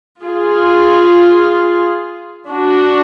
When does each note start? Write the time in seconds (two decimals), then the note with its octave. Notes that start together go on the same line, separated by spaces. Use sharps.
0.22 F4 G#4
2.51 D4 F#4